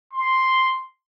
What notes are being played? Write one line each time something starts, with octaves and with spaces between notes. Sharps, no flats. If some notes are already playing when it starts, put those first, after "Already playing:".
C6